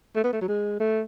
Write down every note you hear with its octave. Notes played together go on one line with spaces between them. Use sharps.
A3
B3
A3
F#3
G#3
A3